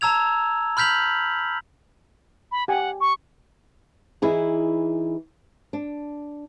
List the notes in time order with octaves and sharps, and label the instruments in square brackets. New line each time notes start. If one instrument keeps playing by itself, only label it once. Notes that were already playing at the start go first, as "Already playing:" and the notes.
[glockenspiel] A5 A#5 E6 G#6 F7
B5 F6 G6 B6 F7 F#7
[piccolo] B5
[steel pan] G4 G#5 [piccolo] F#5
[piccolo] C#6
[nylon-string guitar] E3 D#4 E4 G#4
D4